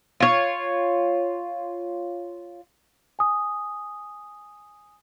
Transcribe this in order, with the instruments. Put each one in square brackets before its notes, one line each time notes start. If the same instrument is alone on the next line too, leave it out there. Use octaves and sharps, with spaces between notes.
[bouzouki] F4 C#5
[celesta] G#5 D#6